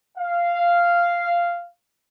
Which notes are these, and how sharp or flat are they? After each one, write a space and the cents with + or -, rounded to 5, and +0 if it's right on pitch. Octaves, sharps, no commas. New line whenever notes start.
F5 -10